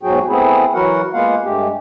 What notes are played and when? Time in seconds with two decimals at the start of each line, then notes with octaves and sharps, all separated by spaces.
0.03 E2 G#2 F#3 F#4 G#4 G5
0.28 A3 B3 C4 E4 G#4
0.74 E3 F#3 E4 F#4 A#4 F#5
1.14 G#3 A#3 B3 F4 F5 F#5
1.44 G2 G#3 A3 G4